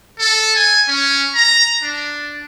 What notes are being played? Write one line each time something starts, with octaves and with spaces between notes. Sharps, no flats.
A4
G#5
C#4
A#5
D4